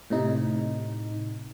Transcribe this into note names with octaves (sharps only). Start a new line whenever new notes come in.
A2 C3 D#4